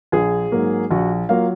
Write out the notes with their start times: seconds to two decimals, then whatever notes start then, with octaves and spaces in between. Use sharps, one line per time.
0.12 A#1 G#4 G#5
0.52 G#2 F#3 A#3
0.91 A#1 F#4 F#5
1.29 F#3 A#3 F4 F5